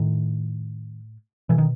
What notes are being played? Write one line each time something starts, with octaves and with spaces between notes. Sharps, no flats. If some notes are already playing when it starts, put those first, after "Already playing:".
Already playing: A2 D#3
B2 E3
D#3